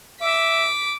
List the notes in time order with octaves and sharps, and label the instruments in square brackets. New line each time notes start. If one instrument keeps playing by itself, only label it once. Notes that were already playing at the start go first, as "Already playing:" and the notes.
[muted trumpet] E5 [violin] D6 B6